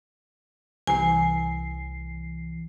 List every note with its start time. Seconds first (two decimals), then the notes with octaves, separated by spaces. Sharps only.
0.87 C2 E3 G#5 C7